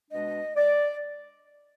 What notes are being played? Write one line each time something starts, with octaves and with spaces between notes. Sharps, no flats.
B2 G#3 D4 D#5
D5